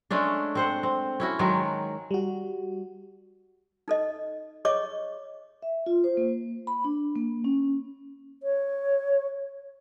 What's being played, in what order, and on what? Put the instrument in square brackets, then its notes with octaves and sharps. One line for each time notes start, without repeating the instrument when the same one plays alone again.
[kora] G#3 A3 C#4 D4
C4 C5 F#5
C4
C#4 E4 F#4
D#3 F#3 G#3
[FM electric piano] G3 F#4
[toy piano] D#4 A4 D#5
G#4 C#5 D#5 C#6 D6
[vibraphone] E5
F4
C5
A#3
B5
D4
A#3
C#4
[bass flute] C#5